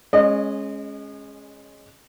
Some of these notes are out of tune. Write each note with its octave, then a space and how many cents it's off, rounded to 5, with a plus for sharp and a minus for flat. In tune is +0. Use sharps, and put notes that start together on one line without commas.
G#3 +5 C#4 -15 D#5 -30